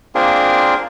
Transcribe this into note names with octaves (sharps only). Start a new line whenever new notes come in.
A#3 C4 D4 F4 G#4 A#4